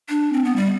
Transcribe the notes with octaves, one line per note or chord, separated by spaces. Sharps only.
D4
C4
B3
G3